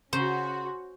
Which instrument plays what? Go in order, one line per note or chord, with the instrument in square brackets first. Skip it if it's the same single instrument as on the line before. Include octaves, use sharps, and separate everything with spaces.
[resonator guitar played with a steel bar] C#3 [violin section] C#4 F#4 [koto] C5 [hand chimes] C6